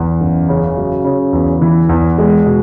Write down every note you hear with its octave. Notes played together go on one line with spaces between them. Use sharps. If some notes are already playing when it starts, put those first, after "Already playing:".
Already playing: E2
F#1
C#3
F#3
C#3
E2
E3
E2
G#3
B2